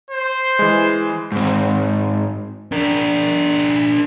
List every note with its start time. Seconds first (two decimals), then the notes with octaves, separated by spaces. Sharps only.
0.11 C5
0.59 E3 G#3
1.32 G#2 C4
2.72 D4 A#4